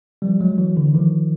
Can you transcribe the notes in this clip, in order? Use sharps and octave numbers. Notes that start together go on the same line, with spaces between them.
F3 G3
F#3 G#3
E3 F#3
D3 E3
D#3 F3